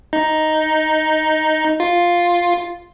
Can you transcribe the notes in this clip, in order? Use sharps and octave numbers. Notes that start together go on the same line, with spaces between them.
D#4
F4